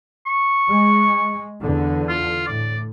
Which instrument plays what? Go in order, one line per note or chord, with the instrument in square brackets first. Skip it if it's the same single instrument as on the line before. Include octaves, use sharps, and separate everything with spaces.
[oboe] C#6
[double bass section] G#3
E2 D3
[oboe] F4
[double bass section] A2 [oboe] D5